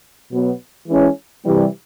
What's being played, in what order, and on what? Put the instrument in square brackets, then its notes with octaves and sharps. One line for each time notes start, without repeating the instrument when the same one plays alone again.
[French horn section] B2 F#3 B3
E3 G#3 C#4 E4
C3 E3 G3